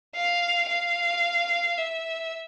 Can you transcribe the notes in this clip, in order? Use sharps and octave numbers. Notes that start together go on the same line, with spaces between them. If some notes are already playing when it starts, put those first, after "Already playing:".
F5
F5
E5